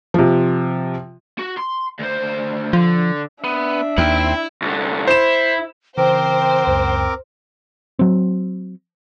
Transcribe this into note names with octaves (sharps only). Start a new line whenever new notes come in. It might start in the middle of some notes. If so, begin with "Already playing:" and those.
C3 F3
F#4
C6
D2 C5
D3 F3
B3 D4 E5
D#2 C4 E4 G5
C2 D3
E4 C5 E7
C#3 E3 C4 A#4 C5 G5 D6
C#2 F#2
F#3 C4